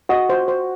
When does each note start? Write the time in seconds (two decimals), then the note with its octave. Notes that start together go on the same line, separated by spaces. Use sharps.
0.09 F#4 D#5
0.30 C5
0.48 C5